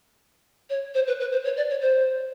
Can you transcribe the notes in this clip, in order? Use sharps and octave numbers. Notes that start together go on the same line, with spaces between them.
C#5
C5
B4
B4
C5
C#5
D5
C#5
C5